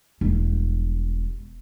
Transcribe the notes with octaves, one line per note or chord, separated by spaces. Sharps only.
E1 G3